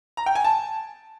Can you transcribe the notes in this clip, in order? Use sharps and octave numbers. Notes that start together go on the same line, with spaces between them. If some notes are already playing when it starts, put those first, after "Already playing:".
A#5
G5
G#5
A5